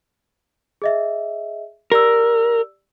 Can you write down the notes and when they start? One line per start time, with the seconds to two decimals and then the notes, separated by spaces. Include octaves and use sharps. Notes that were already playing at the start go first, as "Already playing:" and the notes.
0.82 G#4 D#5 E5
1.92 G4 A#4 D5 E6